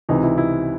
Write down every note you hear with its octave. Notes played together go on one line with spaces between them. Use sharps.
C#2 C3 E3 D#4
E4
E4